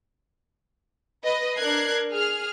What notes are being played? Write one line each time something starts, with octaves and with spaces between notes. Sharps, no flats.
B4 D#5
D4 A#4 F#6 G#6 C7
G#4 F6